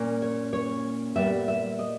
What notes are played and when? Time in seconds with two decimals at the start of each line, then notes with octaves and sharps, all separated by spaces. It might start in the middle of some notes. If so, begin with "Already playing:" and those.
Already playing: A#2 A#3 C#4
0.22 C#5
0.53 C#5
1.15 A#2 G3 B3 E5
1.48 E5
1.79 D#5